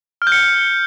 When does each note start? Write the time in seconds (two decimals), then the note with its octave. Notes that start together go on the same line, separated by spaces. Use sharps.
0.22 F6
0.27 G6
0.32 C#7